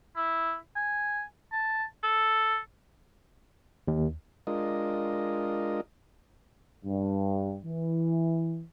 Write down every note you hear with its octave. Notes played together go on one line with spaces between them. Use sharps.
E4
G#5
A5
A4
D#2
G#3 D4 F4 A#4 D#5
G2
E3